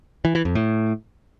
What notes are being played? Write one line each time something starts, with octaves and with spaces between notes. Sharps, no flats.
E3
E3
F2
A2